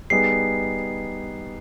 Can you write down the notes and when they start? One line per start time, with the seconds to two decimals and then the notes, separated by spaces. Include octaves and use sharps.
0.10 G3 B3 D#4 G#4 C7